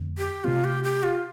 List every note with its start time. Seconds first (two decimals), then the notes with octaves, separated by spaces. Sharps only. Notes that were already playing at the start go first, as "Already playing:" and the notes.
Already playing: F2 D3 A3 C4
0.18 G4
0.44 C3 A3 C4 F4
0.64 G4
0.84 G4
1.03 F4